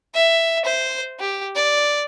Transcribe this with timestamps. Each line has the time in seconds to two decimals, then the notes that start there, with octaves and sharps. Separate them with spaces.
0.15 E5
0.65 C5
1.20 G4
1.56 D5